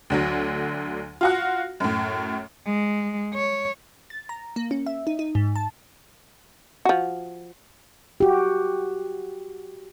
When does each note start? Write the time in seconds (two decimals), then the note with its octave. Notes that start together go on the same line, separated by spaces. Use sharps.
0.10 D2 D3 F#3
1.21 F4 F#4 F#5
1.80 F#2 A2
2.66 G#3
3.34 C#5
4.10 A6
4.29 A#5
4.56 A#3
4.71 C#4
4.87 E5
5.07 D#4
5.19 D#4
5.35 G#2
5.56 A5
6.85 F3 F#4
8.20 F#4 G4